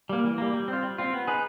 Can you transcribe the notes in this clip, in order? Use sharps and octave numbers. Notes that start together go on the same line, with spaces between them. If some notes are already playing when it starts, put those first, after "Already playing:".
G3 A#3
E3
G3 A#3
G3
C4
F4
G3
C4 F4
B3
D#4 G#4 B4